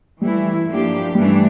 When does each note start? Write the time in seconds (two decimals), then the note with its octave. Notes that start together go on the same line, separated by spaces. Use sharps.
0.21 E3 G3 A3 E4
0.68 G2 F3 A#3 D4 G4
1.15 G2 E3 G3 A3 D4